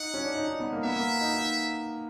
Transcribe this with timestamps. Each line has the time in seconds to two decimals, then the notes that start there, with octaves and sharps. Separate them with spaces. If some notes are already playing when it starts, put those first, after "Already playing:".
Already playing: D#4 F#5
0.14 C#4
0.24 D4
0.35 D#4
0.48 D#4
0.60 B3
0.72 A#3
0.85 B3 E5
0.96 A#3
1.21 D#4
1.34 D#4